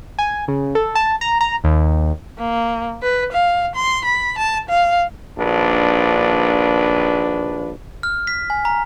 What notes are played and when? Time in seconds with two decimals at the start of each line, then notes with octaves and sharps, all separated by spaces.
0.19 G#5
0.48 C#3
0.75 A4
0.95 A5
1.21 A#5
1.41 A#5
1.64 D#2
2.39 A#3
3.02 B4
3.32 F5
3.75 C6
4.05 B5
4.38 A5
4.69 F5
5.39 A#1 D#2 F3 D4 B4
8.03 F6
8.27 B6
8.50 G#5
8.65 A#5